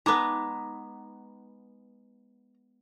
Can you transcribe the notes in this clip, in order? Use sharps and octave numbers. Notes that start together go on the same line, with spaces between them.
G#3 B3 D#4 A#5 D6